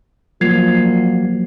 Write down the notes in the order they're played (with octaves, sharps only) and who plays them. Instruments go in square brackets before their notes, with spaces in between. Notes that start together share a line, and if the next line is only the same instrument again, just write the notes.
[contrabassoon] A#2 [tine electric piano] F3 A#3 [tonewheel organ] F#3 [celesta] G#6 C7 F7